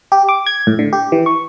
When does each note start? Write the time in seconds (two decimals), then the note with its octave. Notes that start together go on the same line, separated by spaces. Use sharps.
0.12 G4
0.29 D6
0.46 G#6
0.67 A2
0.79 D3
0.93 G4
1.12 E3
1.26 C#6